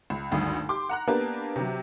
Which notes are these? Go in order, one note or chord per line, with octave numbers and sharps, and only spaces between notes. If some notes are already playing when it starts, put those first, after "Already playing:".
C#2
G#1 D2 G2 D#6
G4 C6 D6
F#5 A#5 F#6
A#3 B3 D4 G4 A#4 B4
C3 F#3